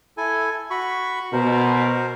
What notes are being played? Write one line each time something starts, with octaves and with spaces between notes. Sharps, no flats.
E4 A4 G#5
F#4 B5 C#6
B2 A#4 C5